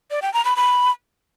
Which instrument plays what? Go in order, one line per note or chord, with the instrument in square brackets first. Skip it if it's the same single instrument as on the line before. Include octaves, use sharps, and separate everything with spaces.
[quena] D5
G5
A#5
B5
B5